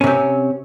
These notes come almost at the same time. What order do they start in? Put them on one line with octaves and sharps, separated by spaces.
C#4 C3 C4